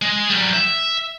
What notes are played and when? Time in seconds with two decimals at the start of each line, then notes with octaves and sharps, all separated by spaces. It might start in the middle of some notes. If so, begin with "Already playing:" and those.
0.02 G#3
0.30 F#3 G3
0.54 E5